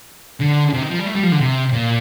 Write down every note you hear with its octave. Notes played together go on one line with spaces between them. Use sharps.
D3
C3
D#3
F3
G3
A3
G3
F3
D3
C3
A#2